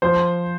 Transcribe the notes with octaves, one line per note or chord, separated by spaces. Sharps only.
F3 C5